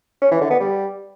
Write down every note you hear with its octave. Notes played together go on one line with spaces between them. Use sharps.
C#4
E3
D3
B3
G3